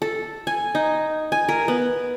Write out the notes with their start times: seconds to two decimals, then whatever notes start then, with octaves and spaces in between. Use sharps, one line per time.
0.02 A4
0.47 G#5
0.75 D#4
1.32 G#5
1.49 A#4
1.68 B3